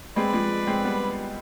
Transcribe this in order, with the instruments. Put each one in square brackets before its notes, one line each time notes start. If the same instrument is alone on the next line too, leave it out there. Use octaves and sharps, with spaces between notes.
[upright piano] G#3 C4 [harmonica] B4 D5
[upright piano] F3 G#3
G#3 C4
G3 B3